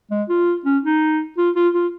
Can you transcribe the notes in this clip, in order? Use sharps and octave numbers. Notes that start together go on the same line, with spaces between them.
G#3
F4
C#4
D#4
F4
F4
F4